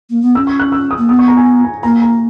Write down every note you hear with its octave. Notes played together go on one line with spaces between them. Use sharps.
A#3
B3
C#4 E6
C#6
F#6
E6
D#6
A#3
B3 D#6
C#6
A#5
G#5
A#5
A#3 A#5
A#5